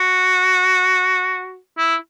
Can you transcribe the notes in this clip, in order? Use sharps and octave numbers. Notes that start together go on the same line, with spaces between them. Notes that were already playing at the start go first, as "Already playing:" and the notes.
Already playing: F#4
E4